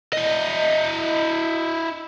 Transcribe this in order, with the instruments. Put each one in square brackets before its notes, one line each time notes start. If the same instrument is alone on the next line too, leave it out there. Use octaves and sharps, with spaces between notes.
[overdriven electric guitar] E4 D#5